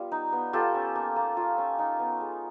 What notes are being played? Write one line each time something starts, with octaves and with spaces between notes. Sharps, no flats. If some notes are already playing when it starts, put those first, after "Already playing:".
Already playing: G3 B3 F4 G4
D#4
B3
F4 G4 A4
C#4
A#3
A#3
F4
C#4
D#4
B3
G#3